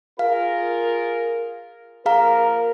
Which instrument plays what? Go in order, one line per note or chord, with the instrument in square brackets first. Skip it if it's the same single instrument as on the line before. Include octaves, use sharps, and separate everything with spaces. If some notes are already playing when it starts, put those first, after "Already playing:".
[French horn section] F4 G#4 A#4 [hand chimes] F5
[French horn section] F3 A#3 A#4 [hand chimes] G#4 F5 A#5